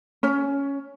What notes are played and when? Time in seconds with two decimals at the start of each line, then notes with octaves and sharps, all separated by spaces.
0.23 C#4